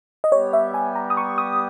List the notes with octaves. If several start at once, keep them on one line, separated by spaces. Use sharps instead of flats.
D#5
G3 B3 G4 C#5
E5
G#5
A#5
D#6
C#6
D#6